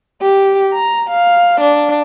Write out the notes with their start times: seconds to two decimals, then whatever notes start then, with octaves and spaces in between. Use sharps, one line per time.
0.22 G4
0.73 A#5
1.10 F5
1.61 D4